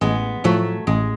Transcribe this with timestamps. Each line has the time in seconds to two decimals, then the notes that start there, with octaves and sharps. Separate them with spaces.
0.01 A1 G#3 B3
0.44 A2 F3 F#3 A3
0.87 A1 G#3